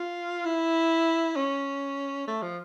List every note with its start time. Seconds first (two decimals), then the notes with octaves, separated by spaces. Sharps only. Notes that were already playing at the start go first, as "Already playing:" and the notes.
Already playing: F4
0.45 E4
1.36 C#4
2.27 A3
2.43 F3